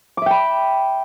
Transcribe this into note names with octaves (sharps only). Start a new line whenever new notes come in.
E5 G5 B5 D6